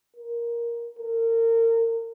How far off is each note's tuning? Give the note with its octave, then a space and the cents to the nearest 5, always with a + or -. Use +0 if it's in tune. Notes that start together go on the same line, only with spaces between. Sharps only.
A#4 +10
A#4 -30